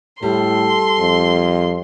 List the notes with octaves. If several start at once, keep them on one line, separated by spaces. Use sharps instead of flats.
A2 G3 A4 C6
F2